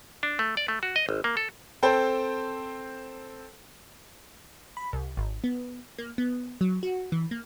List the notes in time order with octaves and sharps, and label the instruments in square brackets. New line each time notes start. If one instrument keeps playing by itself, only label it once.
[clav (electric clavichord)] D4
A3
D5
A3
F#4
D#5
G#1
A#3
A4
[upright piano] C4 A4 C5 G5 A5
[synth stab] B5
C2
G#1
B3
A#3
B3
F#3
F#4
E3
A#3